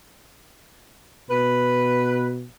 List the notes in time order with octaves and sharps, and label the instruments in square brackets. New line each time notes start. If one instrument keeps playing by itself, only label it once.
[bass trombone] B2 [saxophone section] B4